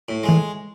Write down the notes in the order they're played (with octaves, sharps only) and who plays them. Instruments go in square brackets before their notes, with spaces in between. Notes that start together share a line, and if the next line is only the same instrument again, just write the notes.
[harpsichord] A2
G#3
[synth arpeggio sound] E3